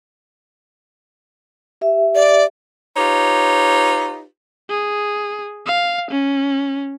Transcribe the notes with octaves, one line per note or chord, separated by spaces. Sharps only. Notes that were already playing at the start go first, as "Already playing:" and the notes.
G4 E5
D5
D#4 F4 G4 B4 C#5
G#4
F5
C#4